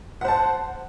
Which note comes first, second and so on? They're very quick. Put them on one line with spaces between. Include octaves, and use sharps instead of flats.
F#5 C5 A5